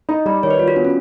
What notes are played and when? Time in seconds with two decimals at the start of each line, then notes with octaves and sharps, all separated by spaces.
0.09 D#4 D#5
0.26 G3 D5
0.43 D#3 C#5
0.51 B4
0.59 G3 F4
0.68 F#4
0.76 B3 D4
0.85 C#4